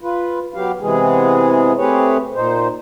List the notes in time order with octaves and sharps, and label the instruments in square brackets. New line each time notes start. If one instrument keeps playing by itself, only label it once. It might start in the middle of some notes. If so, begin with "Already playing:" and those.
[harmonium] F4 B4
F#3 B3 G4 F5
C3 E3 G#3 B3 G#4
A3 C4 G4 G#4 B4 C#5
A#2 D#4 C5